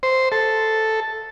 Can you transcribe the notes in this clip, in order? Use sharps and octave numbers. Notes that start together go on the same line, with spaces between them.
C5
A4